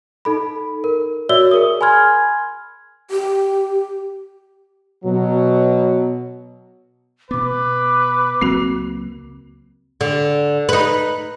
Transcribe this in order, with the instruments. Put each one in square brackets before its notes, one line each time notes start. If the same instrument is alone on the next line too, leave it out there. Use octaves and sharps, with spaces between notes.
[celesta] D#4 A4 B5
A#4
F#4 C#5 D5 E5 E6 G7
G#4 A#4 D#6
G#5 B5 C6 F6 G#6
[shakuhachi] G4
[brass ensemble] B2 F#3
[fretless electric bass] B2 B3 [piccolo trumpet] B4 [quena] D6
[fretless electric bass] C#2 F#3 A#3 [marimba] C4 F#4
[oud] D3
D#4 B4